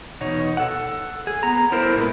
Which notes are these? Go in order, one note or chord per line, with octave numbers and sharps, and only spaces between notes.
E2 B2 D#4 C#5
A4 F#5
G#4
B3 A#5
B3 E4 A4 A#4 C5
A#2 G#3 B4